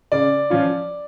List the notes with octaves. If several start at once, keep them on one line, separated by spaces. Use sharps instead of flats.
C#3 D5
F3 C#4 F4